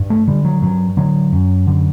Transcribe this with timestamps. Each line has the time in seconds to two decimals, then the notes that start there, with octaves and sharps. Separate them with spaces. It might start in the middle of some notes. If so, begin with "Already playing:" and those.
Already playing: G2
0.10 A3
0.28 D3 G3
0.45 F#3
0.62 G2 F#3
0.97 D3 F#3
1.33 F#2
1.67 D3